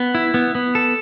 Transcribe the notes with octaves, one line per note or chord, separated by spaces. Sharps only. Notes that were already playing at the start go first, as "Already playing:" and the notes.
Already playing: B3
E4
B3
B3
A4